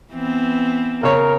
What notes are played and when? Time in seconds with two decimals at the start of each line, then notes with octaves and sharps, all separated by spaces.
0.13 E3 B3 C4
1.03 C#3 A#4 C#5